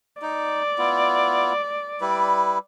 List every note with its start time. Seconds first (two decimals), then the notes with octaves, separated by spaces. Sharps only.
0.22 D#4 D5
0.78 B3 E4 F4
2.01 G3 E4 B4